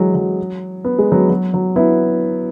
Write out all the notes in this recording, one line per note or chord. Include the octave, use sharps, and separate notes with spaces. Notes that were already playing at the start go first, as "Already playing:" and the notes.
Already playing: E3 F#3 G#3
F#3
B3
G#3
F#3 B3
F#3
F#3
B3 E4